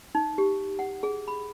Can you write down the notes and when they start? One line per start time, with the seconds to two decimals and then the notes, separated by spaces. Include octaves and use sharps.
0.15 D#4
0.38 G4
0.79 F#5
1.03 G#4
1.28 B5